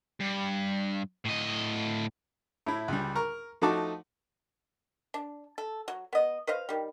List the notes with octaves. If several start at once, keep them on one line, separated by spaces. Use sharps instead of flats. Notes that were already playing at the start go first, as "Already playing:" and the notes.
G2
A2 D#5
A2 E4
C#2 G3
A#4 A#5 C#6
F3 A3 D#4 F#4 A5 D6
D4
A4
F#3
B3 D#5
B4 C5 D#5 F5
D#3 G3